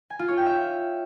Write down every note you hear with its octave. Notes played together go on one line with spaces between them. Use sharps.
G#5
F4
C#5
G5
E5